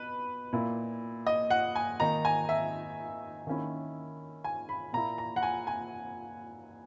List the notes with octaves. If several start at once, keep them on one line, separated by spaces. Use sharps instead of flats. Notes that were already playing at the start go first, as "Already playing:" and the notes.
Already playing: B2 B4
A#2 A#3 E4
D#5
F#5
G#5
D#3 A#3 D#4 A#5
G#5
E5
D#3 A#3 C#4 E4
G#5
B5
A#2 A#3 E4 A#5
A#5
F#5
G#5
G#5